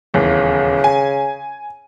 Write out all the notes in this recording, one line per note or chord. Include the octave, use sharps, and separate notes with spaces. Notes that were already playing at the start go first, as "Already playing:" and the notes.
D#1 E2 C#3
G#5